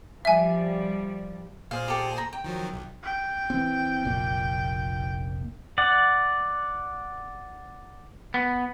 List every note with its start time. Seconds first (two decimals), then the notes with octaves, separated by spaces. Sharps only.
0.25 F3 G3 E5 G#5
1.71 A#2 G#4 C5 F5
1.88 G4 A4
2.18 A#5
2.33 G5
2.44 D#3 F3 F#3
2.73 B1
3.04 G5
3.50 E3 C4
4.04 F1 A#1 A#2
5.78 D5 F#5
8.34 B3